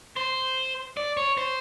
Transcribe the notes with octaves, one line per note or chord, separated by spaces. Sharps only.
C5
D5
C#5
C5